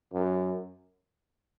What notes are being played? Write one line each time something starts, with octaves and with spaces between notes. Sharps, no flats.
F#2